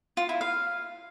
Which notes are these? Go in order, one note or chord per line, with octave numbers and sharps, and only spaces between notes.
F4
E4
F5